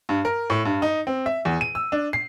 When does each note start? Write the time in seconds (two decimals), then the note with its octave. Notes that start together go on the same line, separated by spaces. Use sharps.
0.09 G2
0.25 A#4
0.50 A2
0.65 G2
0.82 D#4
1.07 C4
1.26 E5
1.45 E2
1.61 D#7
1.75 E6
1.92 D4
2.13 C7